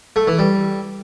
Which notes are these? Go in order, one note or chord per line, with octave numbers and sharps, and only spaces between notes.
A3
E3
G3